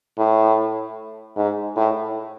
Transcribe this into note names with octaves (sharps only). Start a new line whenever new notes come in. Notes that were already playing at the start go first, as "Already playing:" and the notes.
A2
G#2
A2